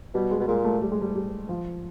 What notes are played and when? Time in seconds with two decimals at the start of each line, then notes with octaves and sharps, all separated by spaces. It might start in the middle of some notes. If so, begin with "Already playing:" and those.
0.14 B2 G3
0.31 G#3
0.40 B2
0.48 A#2 G#3
0.65 A3
0.82 G3
0.92 G#3
1.02 G3
1.16 G3
1.49 F3